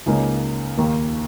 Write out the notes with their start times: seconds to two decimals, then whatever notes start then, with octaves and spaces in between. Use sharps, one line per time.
0.06 C#2 C#3 A#3 D#4
0.77 D#2 D#3 A#3